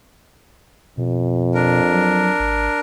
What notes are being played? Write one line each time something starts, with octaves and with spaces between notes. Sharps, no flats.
F2 B2
D4 A#4
F#3
G#1